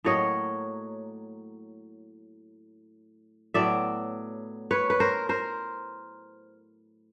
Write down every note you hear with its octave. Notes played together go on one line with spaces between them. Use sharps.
A2 F#3 A#3 C#5 D#5
A2 F#3 B3 D5 E5
B4 C#5
B4
A#4 C5
A#4 C5